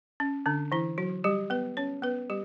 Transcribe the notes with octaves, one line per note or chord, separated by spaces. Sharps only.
C#4
D3 D4
E3 E4
F#3 F#4
G3 G4
B3 B4
C#4 C#5
B3 B4
G3 G4